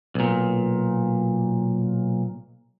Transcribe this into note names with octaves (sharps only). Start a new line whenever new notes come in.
B1 A#2